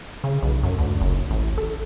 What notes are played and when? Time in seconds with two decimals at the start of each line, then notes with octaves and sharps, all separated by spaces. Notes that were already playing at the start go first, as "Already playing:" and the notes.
0.24 C#3
0.43 B1
0.63 F#2
0.78 D2
1.01 F#1
1.30 A1
1.58 A4